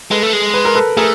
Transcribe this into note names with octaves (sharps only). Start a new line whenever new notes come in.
G#3 A4 B4
A3
G#3
B4
A#4
A4 B4
A3 G#4 A#4